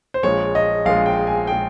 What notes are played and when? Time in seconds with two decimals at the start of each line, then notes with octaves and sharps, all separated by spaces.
0.14 C5
0.23 A#1 A#2 G#3 C#5
0.55 D#5
0.86 A#1 A#2 G#3 F5
1.06 G5
1.27 G#5
1.47 A#2 G#3 G5